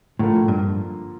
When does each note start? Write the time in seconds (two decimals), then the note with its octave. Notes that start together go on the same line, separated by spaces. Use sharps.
0.19 A2 D3 F3 A#3 F4 A#4
0.48 G2